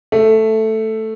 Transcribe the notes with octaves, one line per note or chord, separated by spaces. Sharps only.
A3